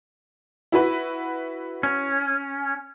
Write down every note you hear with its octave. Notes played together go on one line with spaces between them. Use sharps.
E4 F#4 B4
C#4